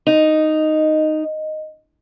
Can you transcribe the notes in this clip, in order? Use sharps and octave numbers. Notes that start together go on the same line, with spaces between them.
D#4 D#5